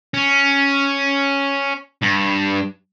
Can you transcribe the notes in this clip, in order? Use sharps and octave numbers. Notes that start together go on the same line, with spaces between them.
C#4
G2